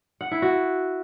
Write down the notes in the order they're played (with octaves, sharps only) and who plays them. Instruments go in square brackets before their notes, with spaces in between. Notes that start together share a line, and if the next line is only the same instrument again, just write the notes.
[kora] F#5
E4
F#4